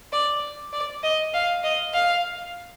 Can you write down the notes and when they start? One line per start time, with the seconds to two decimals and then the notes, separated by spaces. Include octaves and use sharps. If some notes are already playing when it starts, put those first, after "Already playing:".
0.13 D5
0.73 D5
1.03 D#5
1.33 F5
1.64 D#5
1.94 F5